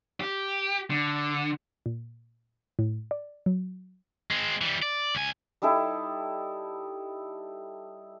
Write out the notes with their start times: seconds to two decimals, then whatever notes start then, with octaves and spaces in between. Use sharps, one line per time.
0.20 G4
0.90 D3
1.86 A#2
2.79 A2
3.11 D5
3.46 F#3
4.31 G#3 C4
4.61 E3 G3
4.82 D5
5.15 C#2 G#5
5.62 G3 D#4 E4 A4